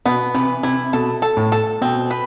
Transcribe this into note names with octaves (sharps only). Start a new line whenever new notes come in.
B2 B3
C3 E3
C3 E4
B2 A4
A4
A2
A4
B2 C4
B4